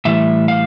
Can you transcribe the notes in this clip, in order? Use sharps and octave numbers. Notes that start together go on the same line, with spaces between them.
A2 E3 G3 E5
F5